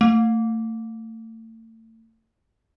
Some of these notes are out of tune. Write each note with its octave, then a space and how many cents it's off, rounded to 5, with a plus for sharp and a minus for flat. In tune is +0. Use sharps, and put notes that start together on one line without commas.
A3 +35